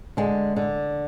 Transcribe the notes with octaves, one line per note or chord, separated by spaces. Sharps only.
D3 G#3
D3